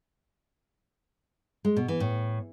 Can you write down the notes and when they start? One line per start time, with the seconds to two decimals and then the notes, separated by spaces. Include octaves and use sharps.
1.65 G#3
1.76 B2
1.88 E3
2.00 A2